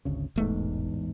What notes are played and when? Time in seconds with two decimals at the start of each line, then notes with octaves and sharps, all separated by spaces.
0.05 G#1 D2 C#3
0.36 E1 A1 E2 G#2 A3